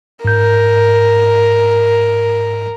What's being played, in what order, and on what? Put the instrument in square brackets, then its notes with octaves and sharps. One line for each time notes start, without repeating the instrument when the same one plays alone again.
[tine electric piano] G#2 G6 [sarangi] A#4